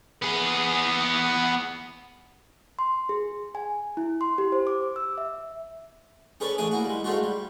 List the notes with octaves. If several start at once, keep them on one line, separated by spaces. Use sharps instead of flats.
B3 G#4
C6
G#4
G#5
E4
C6
G4
C5
D6
E6
E5
C#4 G#4 A4 B4 C#5 D5
A1 D4 G#4 G#5 D6
A#3 E4 F#4
G3 G#3
G#2 A3 D4 F4 F#4
G3